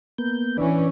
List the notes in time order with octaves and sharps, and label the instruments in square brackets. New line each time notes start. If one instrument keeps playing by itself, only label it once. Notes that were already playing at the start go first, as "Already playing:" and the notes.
[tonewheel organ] A#3 B3 G6
[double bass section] E3 C#4 [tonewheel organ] D4 B4 D5